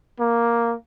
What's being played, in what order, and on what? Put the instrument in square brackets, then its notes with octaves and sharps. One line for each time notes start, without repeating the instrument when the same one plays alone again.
[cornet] A#3